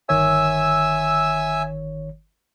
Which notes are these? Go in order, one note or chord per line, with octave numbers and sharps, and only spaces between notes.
G1 D#3 C#5 E5 G#5 E6